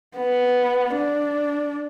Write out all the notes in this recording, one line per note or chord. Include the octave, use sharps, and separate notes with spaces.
B3
D4